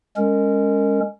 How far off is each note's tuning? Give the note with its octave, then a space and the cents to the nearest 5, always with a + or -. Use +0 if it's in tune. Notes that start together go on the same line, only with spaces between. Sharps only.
G#3 -15 C#4 +0 A#4 -25